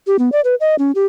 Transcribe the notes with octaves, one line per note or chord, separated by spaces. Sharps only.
G4
B3
D5
B4
D#5
C#4
G4